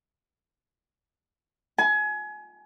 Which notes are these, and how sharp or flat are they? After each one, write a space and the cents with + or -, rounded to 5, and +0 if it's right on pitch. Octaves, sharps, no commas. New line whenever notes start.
G#5 +30